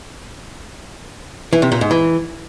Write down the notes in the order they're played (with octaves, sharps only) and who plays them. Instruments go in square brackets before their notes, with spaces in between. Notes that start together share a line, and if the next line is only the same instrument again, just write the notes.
[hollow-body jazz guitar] E3
C3
A#2
G#2
E3